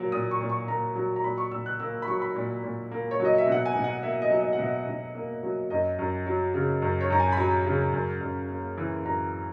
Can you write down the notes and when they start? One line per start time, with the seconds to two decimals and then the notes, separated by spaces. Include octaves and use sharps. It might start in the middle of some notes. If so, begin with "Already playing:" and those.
Already playing: A#2 F#3 A#3
0.12 A#2 D#6
0.31 C#6
0.40 A#2
0.49 C#6
0.68 A#3 A#5
0.95 F#3
1.16 A#5
1.24 A#2 B5
1.38 C#6
1.51 A#2 E6
1.66 F#6
1.80 A#3 E6
2.02 B5
2.07 F#3 C#6
2.22 B5
2.36 A#2
2.64 A#2
2.91 A#3
3.11 C#5
3.20 F#3
3.25 D#5
3.38 E5
3.47 B2
3.52 F#5
3.66 G#5
3.76 B2
3.84 F#5
4.02 A#3 E5
4.22 D#5
4.31 F#3
4.41 D#5
4.53 F#5
4.59 B2 E5
4.86 B2
5.15 A#3
5.43 F#3
5.70 F#2 D#5
5.99 F#2
6.26 F#3
6.54 C#3
6.82 F#2
7.01 C#5
7.10 F#2 A#5
7.20 G#5
7.32 B5
7.37 F#3 A#5
7.66 C#3
7.93 F#2
8.21 F#2
8.49 A#3
8.78 E3
9.05 F#2 A#5